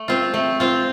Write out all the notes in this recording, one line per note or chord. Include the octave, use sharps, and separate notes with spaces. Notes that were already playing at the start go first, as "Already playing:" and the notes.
Already playing: A3
C4 F4
A3
C4 F4